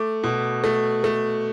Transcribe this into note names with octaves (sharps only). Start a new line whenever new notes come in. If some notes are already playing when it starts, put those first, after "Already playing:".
Already playing: A3 D6
B2
A3
A3